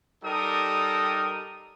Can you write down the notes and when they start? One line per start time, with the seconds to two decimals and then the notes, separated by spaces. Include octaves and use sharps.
0.24 G3 D#4 A4 A#4 D#6